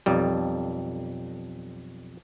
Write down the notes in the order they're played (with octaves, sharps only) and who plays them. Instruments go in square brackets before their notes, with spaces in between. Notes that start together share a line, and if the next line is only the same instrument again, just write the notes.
[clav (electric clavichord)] B1 F2 G3